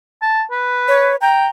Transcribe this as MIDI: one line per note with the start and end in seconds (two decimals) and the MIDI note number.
0.22 0.42 81
0.51 1.13 71
0.88 1.16 73
1.21 1.47 79
1.21 1.48 82